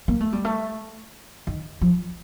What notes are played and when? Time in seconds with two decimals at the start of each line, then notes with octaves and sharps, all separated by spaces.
0.08 A#3
0.20 A3
0.33 G3
0.45 A3
1.47 D#3
1.81 F3